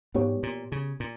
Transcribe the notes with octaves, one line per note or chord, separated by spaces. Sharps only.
G#2 B3 G4 C#5
A#2
C#3
A#2